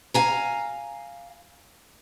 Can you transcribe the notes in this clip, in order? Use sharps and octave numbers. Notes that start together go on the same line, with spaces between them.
F5 G#5 A#5